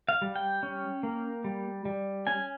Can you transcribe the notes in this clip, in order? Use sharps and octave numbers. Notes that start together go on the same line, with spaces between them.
F5
G3
G5
C#4
A#3
G3
G3
C#4 G#5